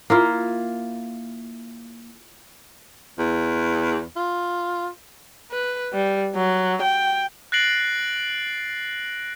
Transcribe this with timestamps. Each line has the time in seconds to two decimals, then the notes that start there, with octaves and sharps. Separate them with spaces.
0.10 A#3 E4 F4
3.19 E2
4.16 F4
5.51 B4
5.93 G3
6.35 F#3
6.82 G5
7.52 F#6 A6 A#6 C7 D7 F#7